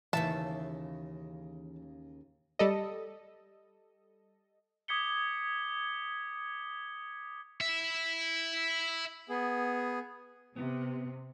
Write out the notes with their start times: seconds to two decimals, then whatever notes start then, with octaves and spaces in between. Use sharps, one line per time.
0.13 D#2 C#3 E3 E5 A5
2.59 G3 A4 D#5
4.88 D6 D#6 G#6 B6 C#7 G7
7.61 E4 E5
9.29 B3 G#4
10.56 C3 B3